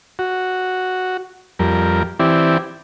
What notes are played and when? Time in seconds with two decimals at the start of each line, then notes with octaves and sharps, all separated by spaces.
0.19 F#4
1.59 F2 G3 A#4
2.20 E3 C4 E4 G4 D5